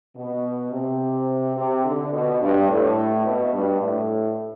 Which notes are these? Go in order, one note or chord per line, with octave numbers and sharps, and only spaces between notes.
B2
C3
C3
D3
B2
G2
A2
B2
G2
A2